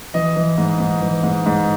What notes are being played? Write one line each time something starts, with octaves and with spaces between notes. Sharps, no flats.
E3 D#5
E3
G#2
G#2
E3
G#2
G#2